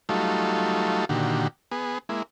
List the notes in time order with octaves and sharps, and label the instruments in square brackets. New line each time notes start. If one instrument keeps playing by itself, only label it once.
[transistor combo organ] F#3 G3 A3 D#4 F4 A4
A#2 D3 D#3 F#4 G4
B3 G#4
G#3 A#3 E4